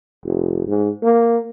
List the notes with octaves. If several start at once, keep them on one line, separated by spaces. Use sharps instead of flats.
F1
G#2
A#3